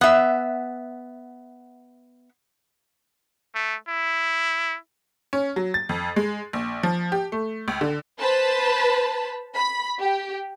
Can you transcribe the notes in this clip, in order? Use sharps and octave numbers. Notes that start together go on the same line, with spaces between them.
B3 E5
A3
E4
C#4
F#3
A6
F2
G#3
A#1
F3
G4
A3
C#2
D3
B4 C5 A5 B5
B5
G4